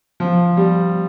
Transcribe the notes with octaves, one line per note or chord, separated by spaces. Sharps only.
F3
G3